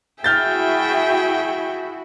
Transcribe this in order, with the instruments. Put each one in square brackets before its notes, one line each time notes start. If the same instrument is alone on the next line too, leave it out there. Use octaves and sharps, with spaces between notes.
[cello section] E4 F#4 [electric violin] G#4 E5 [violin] G5 [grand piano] F6 G6 A6